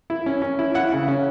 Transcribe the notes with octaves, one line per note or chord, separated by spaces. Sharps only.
E4
C#4
C#4
E4
E4 F#5
C#3
C#4